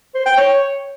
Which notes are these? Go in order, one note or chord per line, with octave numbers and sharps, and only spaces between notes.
C5
G5
C#5